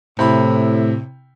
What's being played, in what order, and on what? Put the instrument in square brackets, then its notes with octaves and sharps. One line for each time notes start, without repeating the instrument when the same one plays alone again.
[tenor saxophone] A2 [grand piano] C3 E4 B5